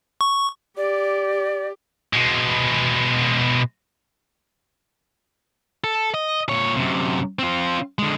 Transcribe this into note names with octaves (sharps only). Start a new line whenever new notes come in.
C#6
G4 D5
B2 G#3
A4
D#5
A#2 C#5
F#2 C3
C4 F4
D3 G#3